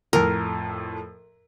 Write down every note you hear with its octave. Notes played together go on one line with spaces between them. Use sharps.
F2 A2 A#4